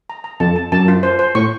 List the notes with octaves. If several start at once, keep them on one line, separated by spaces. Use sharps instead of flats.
A#5
A#5
F2 A5
A5
F#2 A5
F4
C5
C5
A2 C#6